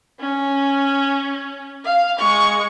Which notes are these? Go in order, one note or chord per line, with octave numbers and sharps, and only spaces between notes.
C#4
F5
G#3 C#6